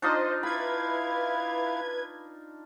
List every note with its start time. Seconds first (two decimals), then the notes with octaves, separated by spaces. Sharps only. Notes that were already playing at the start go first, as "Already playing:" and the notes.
0.02 D4 D#4 F4 C5 D#5
0.43 E4 B4 F5 B5 G#6